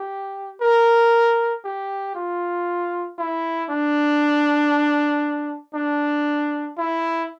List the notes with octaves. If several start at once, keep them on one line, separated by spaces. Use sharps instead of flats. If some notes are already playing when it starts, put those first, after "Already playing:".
Already playing: G4
A#4
G4
F4
E4
D4
D4
E4